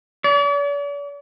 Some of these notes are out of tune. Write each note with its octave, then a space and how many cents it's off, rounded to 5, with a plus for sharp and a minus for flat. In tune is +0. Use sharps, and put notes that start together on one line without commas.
D5 -45